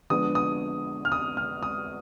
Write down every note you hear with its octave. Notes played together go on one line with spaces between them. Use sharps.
D3 F3 G#3 B3 D4 D#6
D#6
F6
D#6
F6
D#6